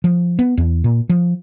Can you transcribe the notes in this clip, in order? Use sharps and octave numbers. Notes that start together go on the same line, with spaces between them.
F3
B3
E2
A#2
F3